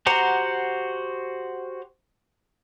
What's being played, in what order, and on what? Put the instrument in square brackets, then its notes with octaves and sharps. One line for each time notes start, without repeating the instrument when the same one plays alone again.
[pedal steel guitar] F#4 G4 C5 F#5 A#5